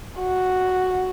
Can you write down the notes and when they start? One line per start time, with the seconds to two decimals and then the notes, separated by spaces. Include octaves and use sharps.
0.19 F#4